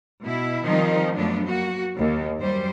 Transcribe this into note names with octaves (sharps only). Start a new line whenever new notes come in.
B2 E4
D#3 F3 G3 C4 D#4
F#2 F3 F#3 A3 B3 D4
A#3 F#4
D#2
F#2 G3 C5